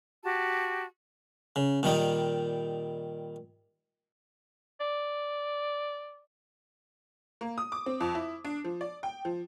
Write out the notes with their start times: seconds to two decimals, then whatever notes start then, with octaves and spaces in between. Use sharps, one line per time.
0.23 F#4 G4 A5
1.56 C#3
1.83 A#2 D#3 G3 D#4
4.80 D5
7.41 A#3
7.58 D#6
7.72 D6
7.86 C4
8.00 F2
8.15 E4
8.45 D4
8.64 F3
8.81 D5
9.03 G5
9.25 F3